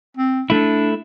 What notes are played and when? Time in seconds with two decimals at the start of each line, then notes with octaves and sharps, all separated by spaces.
0.17 C4
0.50 A3 D4 E4